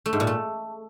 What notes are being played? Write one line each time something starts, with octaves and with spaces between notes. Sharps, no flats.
A3
G#2
A#2
A3